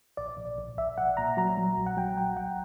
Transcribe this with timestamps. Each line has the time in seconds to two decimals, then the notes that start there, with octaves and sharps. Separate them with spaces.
0.17 A#1 D5
0.37 A#1
0.58 A#1
0.77 A#1 E5
0.98 A#1 F#5
1.17 A#2 A#5
1.37 F#3 A#5
1.57 F#3
1.77 A#1
1.86 F#5
1.97 F#3 G5
2.18 A#1 G5
2.37 A#1 F#5